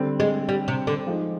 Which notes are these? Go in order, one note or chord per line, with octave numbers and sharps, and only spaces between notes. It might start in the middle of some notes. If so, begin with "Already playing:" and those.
Already playing: D3 G3 C4
G#3
G3
C3
D3
F3 G#3 D#4